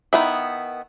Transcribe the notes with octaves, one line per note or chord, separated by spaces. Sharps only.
D#3 B3 E4